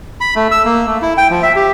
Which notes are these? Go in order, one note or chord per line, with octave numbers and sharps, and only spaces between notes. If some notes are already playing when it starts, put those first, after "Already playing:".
B5
A3
E6
A#3
A3
E4
G5
F3
E5
G4